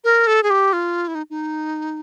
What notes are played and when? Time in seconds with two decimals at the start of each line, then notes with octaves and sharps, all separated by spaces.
0.04 A#4
0.27 A4
0.43 G#4
0.50 G4
0.73 F4
1.08 E4
1.15 D#4
1.30 D#4